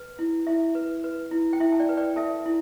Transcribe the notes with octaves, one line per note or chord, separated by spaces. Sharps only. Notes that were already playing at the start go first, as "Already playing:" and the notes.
Already playing: B4
E4
E4 E5
B4
B4
E4
G5
E4 E5
A5
D5 G5
B4
D5 G5
A4 E5 A5
E4